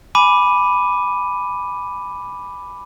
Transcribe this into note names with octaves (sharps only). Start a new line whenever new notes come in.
G#5 B5 D6 D#7